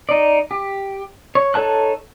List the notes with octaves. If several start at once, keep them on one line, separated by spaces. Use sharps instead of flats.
D#4 D5
G4
C#5
D#4 A4 C#5 A5 F#6